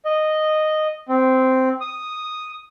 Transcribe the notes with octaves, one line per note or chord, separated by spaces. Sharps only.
D#5
C4
D#6